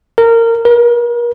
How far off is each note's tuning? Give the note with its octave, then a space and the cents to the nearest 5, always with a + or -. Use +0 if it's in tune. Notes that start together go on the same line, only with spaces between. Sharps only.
A#4 -20
A#4 +40